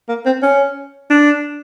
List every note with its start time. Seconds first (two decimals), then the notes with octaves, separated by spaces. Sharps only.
0.09 A#3
0.26 C4
0.42 C#4
1.10 D4